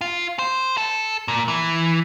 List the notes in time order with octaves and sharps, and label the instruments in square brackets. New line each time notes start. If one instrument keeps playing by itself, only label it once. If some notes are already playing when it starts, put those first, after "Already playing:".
[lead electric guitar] F4
C5
A4
A#2
E3